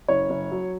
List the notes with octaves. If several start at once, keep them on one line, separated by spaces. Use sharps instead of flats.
F#1 C#5
F#1
F#3